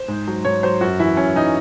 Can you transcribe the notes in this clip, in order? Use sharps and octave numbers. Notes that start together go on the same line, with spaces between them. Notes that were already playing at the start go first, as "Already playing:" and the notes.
Already playing: C5
G#2
F#3
G#2 C#5
F#3 C5
F#2 F#4
E3 E4
F#2 C#4
E3 D#4